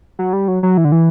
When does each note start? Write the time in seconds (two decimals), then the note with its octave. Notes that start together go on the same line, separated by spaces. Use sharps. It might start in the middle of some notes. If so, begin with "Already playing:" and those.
0.19 F#3
0.33 G3
0.48 F#3
0.63 F#3
0.77 E3
0.85 D3
0.92 E3